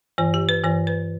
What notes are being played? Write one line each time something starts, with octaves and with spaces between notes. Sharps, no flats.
G2 E3 C5
G4
B4
G2 E3 C5
B4